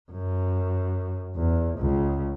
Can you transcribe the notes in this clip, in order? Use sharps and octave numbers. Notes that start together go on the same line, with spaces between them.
F#2
E2
C#2